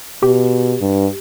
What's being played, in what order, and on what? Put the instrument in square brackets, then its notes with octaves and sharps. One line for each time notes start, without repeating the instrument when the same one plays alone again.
[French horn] B2 [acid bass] G4
[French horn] G2